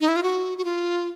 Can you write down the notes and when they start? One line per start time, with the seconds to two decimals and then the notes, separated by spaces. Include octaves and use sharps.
0.01 D#4
0.08 E4
0.16 F4
0.23 F#4
0.58 F#4
0.65 F4